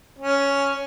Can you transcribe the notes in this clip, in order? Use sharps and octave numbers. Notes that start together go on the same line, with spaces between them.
C#4